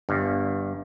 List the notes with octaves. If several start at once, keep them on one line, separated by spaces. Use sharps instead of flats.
G1 G2